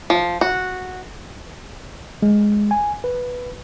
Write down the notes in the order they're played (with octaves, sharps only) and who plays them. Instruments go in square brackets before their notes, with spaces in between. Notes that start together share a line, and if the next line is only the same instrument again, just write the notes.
[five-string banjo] F3
F#4
[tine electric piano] G#3
G#5
B4